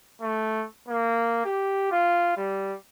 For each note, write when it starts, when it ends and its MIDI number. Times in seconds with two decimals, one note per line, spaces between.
0.22 0.65 57
0.88 1.42 58
1.45 1.88 67
1.92 2.36 65
2.37 2.74 55